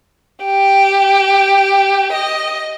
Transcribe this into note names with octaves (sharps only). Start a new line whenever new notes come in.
G4
D#5